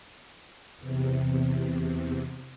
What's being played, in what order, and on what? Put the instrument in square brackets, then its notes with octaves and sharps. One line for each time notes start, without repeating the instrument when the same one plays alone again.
[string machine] E2 C3